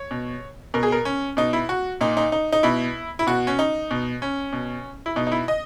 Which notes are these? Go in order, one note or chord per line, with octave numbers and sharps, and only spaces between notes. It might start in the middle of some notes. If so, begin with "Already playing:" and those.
Already playing: C#5
B2
B2 A#4
G#4
A#4
C#4
B2 D#4
E4
F#4
A#2 D#4
D#4
D#4
D#4
B2 E4
E4
B2 F#4
C#4
D#4
B2
C#4
B2
E4
B2 D#4
D#4
E4
D#5